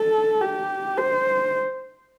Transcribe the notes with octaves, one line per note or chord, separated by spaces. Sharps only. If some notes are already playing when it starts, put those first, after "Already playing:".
Already playing: A4
G4
C5